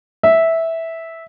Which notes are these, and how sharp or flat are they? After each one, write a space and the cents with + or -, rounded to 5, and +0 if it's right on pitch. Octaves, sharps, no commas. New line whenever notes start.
E5 -10